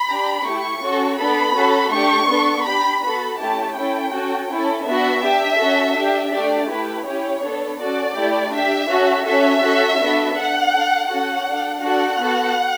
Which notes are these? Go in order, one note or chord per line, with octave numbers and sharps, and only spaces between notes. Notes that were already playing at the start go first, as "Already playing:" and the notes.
Already playing: B5
D4 G4
A3 E4 G4 C#6
C#4 F#4 A4
B3 D4 A4 B5
C#4 F#4 A4
A3 D4 G4 C#6
B3 D4 A4
D4 G4 B5
B3 F#4 A4 B5
A3 C#4 E4 G4 A5
C#4 E4 A4 G5
C#4 F#4 A4
C#4 E4 A4
B3 D4 F#4 E5
D4 G4
C#4 F#4 A4
D4 G4
A3 D4 G4 D5
A3 E4 G4 B4
C#4 E4 G4 C#5
B3 D4 A4
C#4 F#4 A4 D5
A3 E4 G4
D4 G4 E5
C#4 F#4 A4
C#4 F#4 A4 E5
C#4 F#4 A4
B3 D4 F#4 A4
D4 A4 F#5
D4 A4
C#4 F#4 A4 F#5
D4 A4
D4 F#4 A4 F#5
B3 F#4 A4